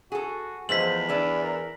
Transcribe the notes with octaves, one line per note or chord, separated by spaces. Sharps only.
F#4 G#4 A4
E2 F3 G#3 A3 C5 B6 F#7
D4 E4 B4 D5
A#4